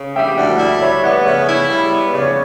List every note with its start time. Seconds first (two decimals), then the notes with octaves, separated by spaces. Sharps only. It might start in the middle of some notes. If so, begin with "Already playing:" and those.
Already playing: C#3
0.16 G3 E5 G5
0.38 D2 D5 F#5
0.59 E4 D5
0.81 G3 C#5 E5
1.03 B3 D5 F#5
1.25 C#3 C#5 E5
1.47 E4 C#5 E5
1.69 G3
1.91 B3
2.13 C#3 D5
2.21 C#5